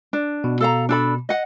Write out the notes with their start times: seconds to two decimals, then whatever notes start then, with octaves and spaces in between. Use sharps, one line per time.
0.13 D4
0.44 B2
0.60 A4 F5 A#5
0.89 D4 A4 B5
1.29 D#5 F#5